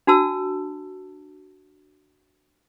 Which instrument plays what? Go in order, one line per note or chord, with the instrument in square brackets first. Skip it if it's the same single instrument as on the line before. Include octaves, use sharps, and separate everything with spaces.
[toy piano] D4 F#4 A5 E6